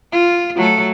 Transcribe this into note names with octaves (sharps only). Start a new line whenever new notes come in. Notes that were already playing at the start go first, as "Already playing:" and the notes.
F4
F#3 A3 A4